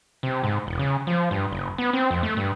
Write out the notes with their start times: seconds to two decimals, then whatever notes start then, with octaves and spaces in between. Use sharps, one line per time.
0.23 C3
0.43 G#2
0.67 E1
0.79 C#3
1.07 F3
1.31 G2
1.51 F#1
1.78 B3
1.93 C4
2.11 F2
2.23 A3
2.37 G2